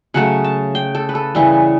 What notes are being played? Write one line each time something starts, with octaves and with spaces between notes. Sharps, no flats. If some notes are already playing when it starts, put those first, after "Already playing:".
C#3 F#3 A3 F#5
A5
G5
A4
B4
A4
C#3 E3 G3